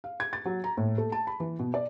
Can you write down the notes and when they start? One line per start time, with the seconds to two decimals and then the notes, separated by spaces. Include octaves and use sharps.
0.04 F5
0.20 G#6
0.33 A6
0.45 F#3
0.64 A#5
0.77 A2
0.98 A3
1.12 A5
1.27 B5
1.40 E3
1.59 B2
1.74 D5